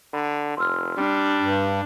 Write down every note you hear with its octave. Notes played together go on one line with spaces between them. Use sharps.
D3 B5
F1 C6 E6 F6
G3 D4
G2